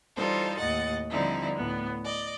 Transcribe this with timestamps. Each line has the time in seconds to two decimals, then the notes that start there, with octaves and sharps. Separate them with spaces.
0.16 E3 G3 D#4 F4 A4 C5
0.58 D#2 A2 D#5 F#5 A6
1.11 D3 F3 G3 C4 D#4 E4
1.56 D2 A2 B3
2.05 D5 D#5